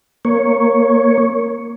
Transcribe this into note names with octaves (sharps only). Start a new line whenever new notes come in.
A#3 C#5